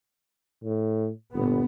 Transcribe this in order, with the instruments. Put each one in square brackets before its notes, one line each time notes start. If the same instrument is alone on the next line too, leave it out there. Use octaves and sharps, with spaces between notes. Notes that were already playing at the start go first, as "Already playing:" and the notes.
[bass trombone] A2
[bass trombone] G1 [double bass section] A#2 B3